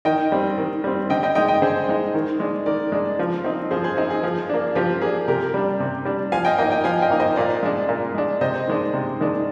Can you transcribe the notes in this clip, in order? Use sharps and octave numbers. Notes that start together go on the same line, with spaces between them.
D#3 D#5 G5
G3 C4
D#3
G3 C4
D3 D#5 G5
D#5 G5
G#3 D#4 D#5 G5
D#5 G5
D3 G#4 C5
G#3 D#4
D#3
G#3 D4
D#3 A#4 D5
G#3 D4
F3
C4 D#4
F3 G#4 C5
G#4 C5
C4 D#4 G#4
G#4
F3
A#3 D4
F3 G4
A#3 D4 G#4
C3 G4 A#4
G3 D4
C3
G3 D4
F3 F5 G#5
D#5 G5
A#3 D#4 D#5 G5
D#5 G5
F3 F5 G#5
D#5 G5
A#3 D#4
C5 D#5
A#2 D5 F5
G#3 D4
A#2
G#3 D4
C3 C5 D#5
D#3 G#3 D4
C3
D#3 G#3 D4